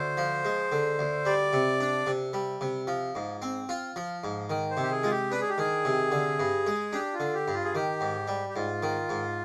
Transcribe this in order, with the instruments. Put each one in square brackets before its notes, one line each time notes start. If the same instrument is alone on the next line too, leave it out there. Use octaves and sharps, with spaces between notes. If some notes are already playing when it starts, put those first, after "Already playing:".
Already playing: [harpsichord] D2 [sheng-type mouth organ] C5
[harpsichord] F3
G#3
D3
D2
[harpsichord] G3 [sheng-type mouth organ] D5
[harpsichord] C3
D4
C3
G3
C3
F3
G#2
C4
F4
F3
G#2
D#3
[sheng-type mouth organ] C5
[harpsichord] C3
[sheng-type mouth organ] G4
G#4
[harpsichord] G#3 [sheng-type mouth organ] F4
[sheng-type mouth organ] G4
[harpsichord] D4 [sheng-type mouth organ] B4
[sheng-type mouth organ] G#4
G4
[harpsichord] D#3 [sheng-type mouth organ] G#4
[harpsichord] C3
D3
G2
G#3
[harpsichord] D4 [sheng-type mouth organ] G4
[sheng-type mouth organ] F4
[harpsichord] D3
[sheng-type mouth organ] G4
[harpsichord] G2
[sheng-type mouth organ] F4
G#4
[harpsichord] D#3 [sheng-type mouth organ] G4
[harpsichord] G#2
G3
[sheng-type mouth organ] G4
[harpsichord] G#2 [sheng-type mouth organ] F4
[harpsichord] D#3
G#2